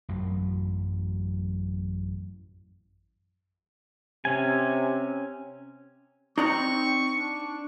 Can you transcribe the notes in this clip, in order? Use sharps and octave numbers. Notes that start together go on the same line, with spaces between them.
A1 F#2 F#3
C3 C#4 G#5
C4 D#4 D5 A#5 C#6
D4